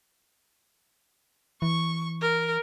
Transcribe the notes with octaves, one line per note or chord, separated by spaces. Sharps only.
E3 C#6
A#4